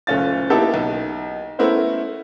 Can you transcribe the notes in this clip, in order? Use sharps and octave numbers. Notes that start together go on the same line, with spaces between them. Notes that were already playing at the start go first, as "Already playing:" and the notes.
F#1 A3 C#4 F4 A6
A#3 B3 D#4 E4 G4 A4
B1
A3 B3 C#4 E4 A#4 C5